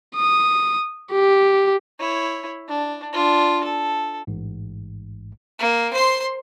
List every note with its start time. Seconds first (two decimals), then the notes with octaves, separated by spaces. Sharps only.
0.16 D#6
1.12 G4
1.99 E4 C#5
2.68 D4
3.13 D4 F4
3.64 A4
4.27 A1 G#2
5.59 A#3
5.93 C5 C6